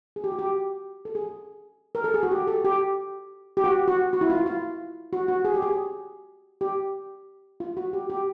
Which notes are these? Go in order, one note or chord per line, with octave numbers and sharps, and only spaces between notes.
G#4
G4
F#4
G4
A4
G#4
A#4
A4
G#4
F#4
G4
A4
G4
G4
F#4
F#4
F#4
E4
F4
F4
F#4
F#4
G#4
G4
G#4
G4
F4
F#4
G4
G4